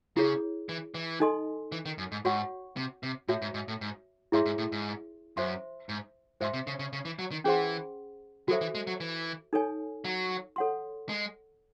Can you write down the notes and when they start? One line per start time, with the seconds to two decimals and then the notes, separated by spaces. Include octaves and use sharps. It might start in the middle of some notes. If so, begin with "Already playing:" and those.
0.17 C#3 E4 G#4 C#5
0.69 E3
0.94 E3
1.20 D#4 A4 D#5 G#5 C6
1.72 E3
1.86 D#3
1.98 F#2
2.12 G#2
2.25 G#2 F#4 C#5 F#5 C#6
2.77 C3
3.03 C3
3.28 A2 F#4 C#5 E5
3.42 G#2
3.54 G#2
3.68 A2
3.81 G#2
4.32 G#2 E4 G#4 C#5 E5 C6
4.46 G#2
4.58 A2
4.72 G#2
5.37 F#2 C5 E5 C6
5.89 G#2
6.41 G#2 C5 E5 C6
6.53 C3
6.67 C#3
6.79 C#3
6.93 C#3
7.05 E3
7.19 F#3
7.31 D#3
7.44 E3 C#4 G#4 C5 F#5 C6
8.48 F#3 F#4 A4 C5 E5
8.61 E3
8.75 G#3
8.87 F#3
9.00 E3
9.53 D#4 A4 C#5 G#5
10.05 F#3
10.56 A4 C#5 F#5 C6
11.09 G#3